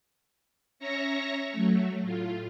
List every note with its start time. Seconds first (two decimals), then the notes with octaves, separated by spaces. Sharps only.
0.79 C#4 C#5 E5 A#5 C#6 A#6
1.52 F#3 A3
2.02 A2 F4